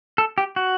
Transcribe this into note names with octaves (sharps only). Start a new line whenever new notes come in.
A4
G4
F#4